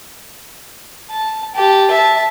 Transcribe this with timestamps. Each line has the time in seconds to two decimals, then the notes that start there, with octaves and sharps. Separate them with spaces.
1.11 A5
1.55 G4 A5
1.91 E5 A5